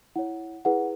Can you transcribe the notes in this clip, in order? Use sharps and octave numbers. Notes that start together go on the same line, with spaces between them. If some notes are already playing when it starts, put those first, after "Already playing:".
E4 C#5 F#5
E4 G#4 B4 F#5